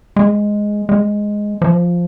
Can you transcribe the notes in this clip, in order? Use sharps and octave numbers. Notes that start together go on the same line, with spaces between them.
G#3
G#3
F3